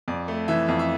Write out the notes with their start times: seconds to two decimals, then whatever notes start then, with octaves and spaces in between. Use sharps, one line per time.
0.08 F2 D5
0.28 A3
0.48 E3 E5
0.68 F2
0.79 E5